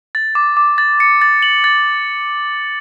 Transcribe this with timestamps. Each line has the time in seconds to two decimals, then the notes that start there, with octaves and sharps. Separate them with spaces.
0.15 A6
0.35 D6
0.57 D6
0.78 A6
1.00 C#7
1.22 A6
1.43 F#7
1.64 A6